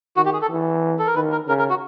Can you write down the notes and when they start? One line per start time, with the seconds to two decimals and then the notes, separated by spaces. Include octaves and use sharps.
0.16 D#3 F#4
0.25 G4
0.33 G#4
0.42 A4
0.50 E3
0.99 A4
1.06 A#4
1.15 D#3 B4
1.32 A#4
1.48 C#3 A#4
1.59 A#4
1.70 F#4